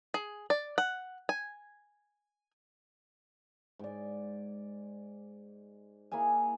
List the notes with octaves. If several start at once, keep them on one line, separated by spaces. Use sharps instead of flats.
G#4
D5
F#5
G#5
G#2 D5
A#3 E4 G#4 G#5